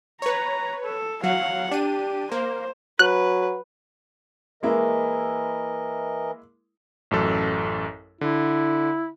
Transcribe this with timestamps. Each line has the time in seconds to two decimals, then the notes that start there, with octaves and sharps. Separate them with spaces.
0.22 B4 C#5 A#5
0.85 A4
1.23 F#3 F5 F#5
1.71 D4 G4 D#7
2.32 A#3 C5
2.99 F#3 B4 F#6
4.63 E3 G#3 A#3 E4 A#4 D#5
7.11 A1 F#2 A4
8.21 D3 E4